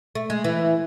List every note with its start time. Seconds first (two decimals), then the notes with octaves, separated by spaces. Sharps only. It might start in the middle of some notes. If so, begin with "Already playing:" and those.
0.15 A3
0.30 G#3
0.44 E3